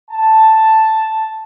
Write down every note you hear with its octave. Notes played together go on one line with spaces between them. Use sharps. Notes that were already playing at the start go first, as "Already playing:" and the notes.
A5